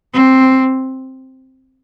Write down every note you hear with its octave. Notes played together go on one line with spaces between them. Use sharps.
C4